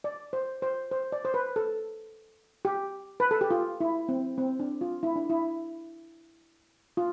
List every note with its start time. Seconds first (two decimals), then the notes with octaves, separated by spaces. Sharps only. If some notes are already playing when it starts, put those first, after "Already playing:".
0.04 D5
0.33 C5
0.62 C5
0.91 C5
1.12 D5
1.25 C5
1.34 B4
1.56 A4
2.65 G4
3.20 B4
3.31 A4
3.41 G4
3.51 F4
3.80 E4
4.09 C4
4.38 C4
4.60 D4
4.81 F4
5.03 E4
5.16 D4
5.30 E4
6.97 F4